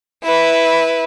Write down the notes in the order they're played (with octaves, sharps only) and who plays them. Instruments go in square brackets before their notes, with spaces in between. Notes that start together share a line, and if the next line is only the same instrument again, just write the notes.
[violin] E4 B4